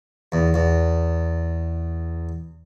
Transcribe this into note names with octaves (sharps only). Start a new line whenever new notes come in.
E2
E2